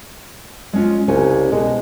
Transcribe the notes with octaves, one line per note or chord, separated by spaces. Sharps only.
G#3 C#4 F4
C2 C#3 C#4 G#5
B2 G#3